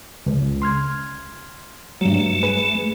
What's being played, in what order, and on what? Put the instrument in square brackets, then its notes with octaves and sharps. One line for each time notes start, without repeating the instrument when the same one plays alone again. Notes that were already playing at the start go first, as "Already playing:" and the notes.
[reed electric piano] C#2
C6 F6 G#6
[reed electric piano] G2 F#3 [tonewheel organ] A3
[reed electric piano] G#4 B4